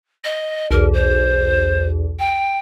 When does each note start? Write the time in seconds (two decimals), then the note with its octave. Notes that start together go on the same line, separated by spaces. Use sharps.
0.24 D#5
0.71 B1 E2 A#4
0.93 C5
2.19 G5